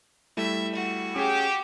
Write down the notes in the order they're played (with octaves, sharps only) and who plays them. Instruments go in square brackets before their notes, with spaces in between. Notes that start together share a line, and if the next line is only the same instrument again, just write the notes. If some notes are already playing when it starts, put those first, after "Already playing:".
[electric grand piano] G3 A3 E4 [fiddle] E5
[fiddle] F#4
[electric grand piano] C#4 G#4 [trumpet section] G4